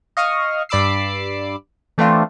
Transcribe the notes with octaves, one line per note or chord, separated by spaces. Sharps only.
D#5 F5 C#6 D#6 F6
G2 D5 B5 D6 E6 C7
E3 A3 C4 D4 F4